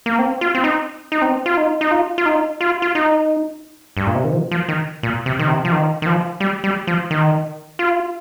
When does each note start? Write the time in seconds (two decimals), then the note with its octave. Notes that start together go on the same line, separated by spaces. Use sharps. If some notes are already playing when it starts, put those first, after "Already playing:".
0.06 A#3
0.19 C4
0.41 F4
0.55 C4
0.64 D#4
1.12 D#4
1.22 C4
1.46 F4
1.57 D#4
1.81 D#4
1.91 F4
2.18 F4
2.26 D#4
2.61 F4
2.82 F4
2.95 D#4
3.97 G2
4.07 A#2
4.15 C3
4.25 D#3
4.33 F3
4.51 F3
4.68 D#3
5.03 A#2
5.26 C3
5.39 D#3
5.48 C3
5.65 F3
5.72 D#3
6.02 D#3
6.06 F3
6.40 G3
6.64 G3
6.87 F3
7.11 D#3
7.79 F4